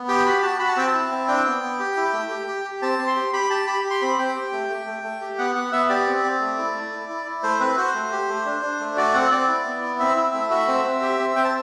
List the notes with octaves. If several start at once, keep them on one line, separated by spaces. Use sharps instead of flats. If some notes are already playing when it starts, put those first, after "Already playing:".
Already playing: B3
G4 G5
F#4 B5
F#4 A5
F#4 B5
A5
C4 G5
A5
E4
C4
D4 G5
B3
B3
G4
E4
A3
G4
G4
G4
C4 A5
C4
C6
G4
G4 B5
G4 A5
G4 B5
G4
C6
C4 B5
C4 G5
G4
A3
A3
A3
A3
G4
B3 F#5
B3 F#5
B3 E5
G4 D5
C4
C4
A3
E4
A3
E4
E4
E4
A3 C5
C4 B4
F#4 C5
A3
G4
A3
D4
D4
A3
F#4 D5
C4 F#5
C4 D5
E4
B3
E4
C4 E5
E4
A3
F#4 E5
C4
C4
G4
C4
C4 G5
A5